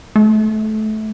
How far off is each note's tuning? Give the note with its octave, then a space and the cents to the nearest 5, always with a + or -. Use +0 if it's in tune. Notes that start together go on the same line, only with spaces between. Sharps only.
A3 -20